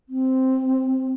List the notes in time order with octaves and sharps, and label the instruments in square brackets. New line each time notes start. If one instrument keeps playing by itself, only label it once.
[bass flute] C4